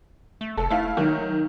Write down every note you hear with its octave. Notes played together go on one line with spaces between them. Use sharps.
A3
F1 A4
A3 E4 F5
D#3 F#3